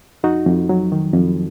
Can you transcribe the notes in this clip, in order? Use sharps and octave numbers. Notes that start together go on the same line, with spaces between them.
F2 D#4 F#4
F2
F#3
D#3
F2